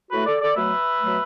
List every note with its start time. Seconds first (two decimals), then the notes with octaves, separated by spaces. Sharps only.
0.11 A2 A3 F#4 B4
0.26 A4 D5
0.41 A4 D5
0.56 B2 F#3 A3 B4 E5
1.01 B2 F#3 A3